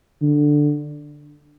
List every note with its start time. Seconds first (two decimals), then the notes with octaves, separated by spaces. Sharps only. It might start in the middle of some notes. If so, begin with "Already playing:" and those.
0.22 D3